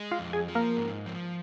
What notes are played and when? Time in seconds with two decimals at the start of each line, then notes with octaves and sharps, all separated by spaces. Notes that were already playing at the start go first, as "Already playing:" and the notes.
Already playing: G#3
0.11 F4 F5
0.19 F2
0.33 G#4 G#5
0.48 F3
0.55 A#3 A#4
0.77 G#2
1.06 F3